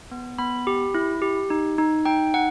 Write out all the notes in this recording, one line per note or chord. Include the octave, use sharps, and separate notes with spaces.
B3
B3 B5
G4
E4
G4
D#4
D#4
D#4 G5
D#4 F#5